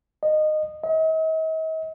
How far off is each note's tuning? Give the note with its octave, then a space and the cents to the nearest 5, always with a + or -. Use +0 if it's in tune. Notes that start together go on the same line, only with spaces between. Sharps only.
D#5 -15
D#5 +45